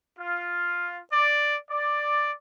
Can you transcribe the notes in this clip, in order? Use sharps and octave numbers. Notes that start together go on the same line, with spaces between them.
F4
D5
D5